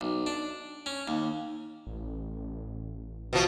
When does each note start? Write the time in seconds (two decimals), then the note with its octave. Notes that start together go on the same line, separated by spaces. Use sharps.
0.01 B1
0.26 D4
0.86 C#4
1.08 D#2
1.87 A1
3.33 B2 F3